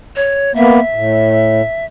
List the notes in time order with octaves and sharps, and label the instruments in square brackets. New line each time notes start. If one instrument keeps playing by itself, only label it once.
[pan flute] C#5
[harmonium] A#3 B3 [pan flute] E5
[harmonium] A2